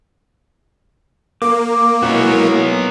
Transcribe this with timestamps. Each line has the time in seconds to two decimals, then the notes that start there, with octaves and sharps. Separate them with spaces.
1.42 A#3 D6
2.03 G#3 B3 E4 F#4 C#5